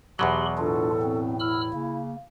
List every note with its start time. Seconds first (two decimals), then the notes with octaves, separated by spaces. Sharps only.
0.19 E2 B2 F#3 G4 B5 C6
0.58 A2 D4 F4 A4
1.02 C4
1.40 E4 B5 E6 F6
1.74 C#3 A#3